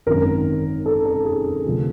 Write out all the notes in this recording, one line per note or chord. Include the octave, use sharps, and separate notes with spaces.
G#1 F#2 D#3 A#4
A4
A4
G#4
D2 C3 F3